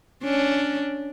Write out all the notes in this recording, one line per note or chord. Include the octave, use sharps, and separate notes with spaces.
C#4 D4